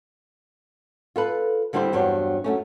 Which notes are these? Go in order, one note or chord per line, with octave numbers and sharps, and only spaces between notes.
F4 A4 B4
D3 G3 C4 E4 G4 C5
E2 G2 F#3 C4 D4 G4
F#2 A3 C#4